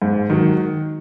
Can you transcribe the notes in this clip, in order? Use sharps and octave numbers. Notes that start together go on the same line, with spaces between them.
G#2
D#3 F#3